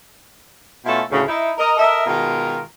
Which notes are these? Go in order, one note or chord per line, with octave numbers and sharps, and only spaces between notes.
B2 A3 C#4 E4 F4 A4
D2 A2 C#3
D#4 E4
A#4 D#5
A4 A#4 D#5 E5
B2 D#3 G#3 F4 A#4